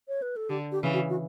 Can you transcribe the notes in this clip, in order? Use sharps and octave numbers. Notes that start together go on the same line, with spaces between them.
C#5
B4
A4
D3 G4
G4
C#3 E3
F#4
F#4